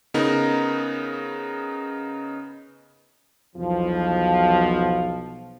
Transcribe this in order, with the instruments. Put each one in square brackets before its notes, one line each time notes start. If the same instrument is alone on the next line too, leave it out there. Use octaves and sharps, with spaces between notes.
[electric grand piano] C#3 B3 D#4 A#4
[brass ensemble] B1 E2 B2 F3